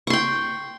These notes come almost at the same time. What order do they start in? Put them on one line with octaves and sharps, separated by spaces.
C#6 C6 G5